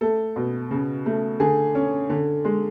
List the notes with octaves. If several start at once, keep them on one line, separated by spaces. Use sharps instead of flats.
A3 A4
B2
C#3
A3
D3 G#4
C#4
D3
G#3